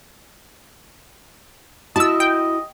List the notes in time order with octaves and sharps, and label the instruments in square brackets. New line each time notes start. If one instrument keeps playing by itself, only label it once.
[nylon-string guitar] E4 F#4 [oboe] D#5 [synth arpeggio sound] A5 E6
[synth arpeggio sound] G5